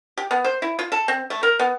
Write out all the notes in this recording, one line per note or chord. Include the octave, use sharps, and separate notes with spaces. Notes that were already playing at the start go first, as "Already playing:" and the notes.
G4
B3
C5
E4
F4
A4
C4
A3
A#4
B3